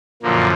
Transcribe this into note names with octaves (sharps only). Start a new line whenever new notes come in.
F#2 A#2 D3 F3 A#3